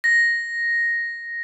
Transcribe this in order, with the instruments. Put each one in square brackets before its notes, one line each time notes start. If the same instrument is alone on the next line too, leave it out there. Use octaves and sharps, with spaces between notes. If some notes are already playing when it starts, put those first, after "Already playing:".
[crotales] A#6